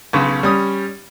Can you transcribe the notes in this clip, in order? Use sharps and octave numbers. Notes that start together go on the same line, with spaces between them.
B1 C#3 B4
G3 C#4 D#6